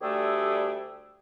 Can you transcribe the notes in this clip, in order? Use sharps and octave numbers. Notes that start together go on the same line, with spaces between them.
D2 G3 A3 G4 G#4 E6